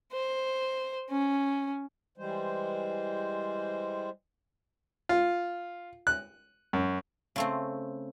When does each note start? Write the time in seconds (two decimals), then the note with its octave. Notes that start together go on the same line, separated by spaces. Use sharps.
0.12 C5
1.10 C#4
2.17 E3 G3 G#3 C5
5.09 F4
6.07 F#6
6.73 F#2
7.36 C#3 A3 C4